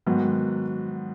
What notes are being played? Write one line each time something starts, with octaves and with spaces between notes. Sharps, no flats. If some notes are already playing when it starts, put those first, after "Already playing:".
G#2 D#3 F#3 B3